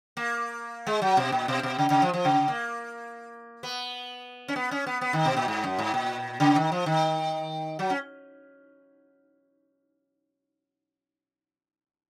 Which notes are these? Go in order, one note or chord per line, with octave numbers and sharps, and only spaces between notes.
A#3
G#3
F#3
B2
A#2
B2
B2
C#3
C#3
F3
F3
C#3
A#3
B3
C#4
B3
C#4
B3
B3
D#3
B2
A#2
G#2
F#2
G#2
A#2
C#3
D#3
F3
D#3
F#3
C#4